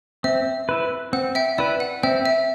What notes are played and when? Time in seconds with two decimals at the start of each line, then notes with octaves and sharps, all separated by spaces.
0.24 C4 E5
0.69 E4 B4
1.13 C4 F#5
1.35 E5 G5
1.58 E4 B4 D5
1.80 F#5
2.03 C4 E5 G5
2.25 E5